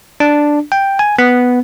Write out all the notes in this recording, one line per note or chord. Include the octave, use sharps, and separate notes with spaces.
D4
G5
G#5
B3